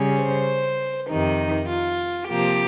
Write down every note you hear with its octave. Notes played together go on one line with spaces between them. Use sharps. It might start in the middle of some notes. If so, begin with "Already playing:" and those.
Already playing: C#3 G3 C#4
C5
F2 C3 D#3 D#4
F4
C3 F3 A#3 G4